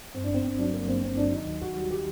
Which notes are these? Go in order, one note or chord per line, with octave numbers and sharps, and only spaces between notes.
G2 C4
D4
G1 C4
G1 C4
F#3 D4
G2 A#3
G1 C4
G1 C4
F#3 D4
D#3 D#4
D#2
D#2 F#4
G3
D#3 G4